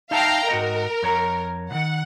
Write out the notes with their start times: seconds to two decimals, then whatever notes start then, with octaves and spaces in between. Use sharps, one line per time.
0.11 D#4 E5 F5 G5 A5 A#5
0.49 G#2 F#4 A#4 D#5
1.02 F2 C#5 A#5
1.71 C2 D#3 F#5